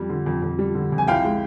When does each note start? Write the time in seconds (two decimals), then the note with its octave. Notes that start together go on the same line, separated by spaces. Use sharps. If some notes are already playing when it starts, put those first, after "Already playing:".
Already playing: F2 G3
0.09 D3
0.26 F2
0.42 F2
0.59 G3
0.75 D3
0.92 F2
0.98 G#5
1.08 C2 F5 G5
1.24 G#3